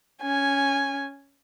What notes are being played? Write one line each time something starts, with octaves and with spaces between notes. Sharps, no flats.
C#4 G#5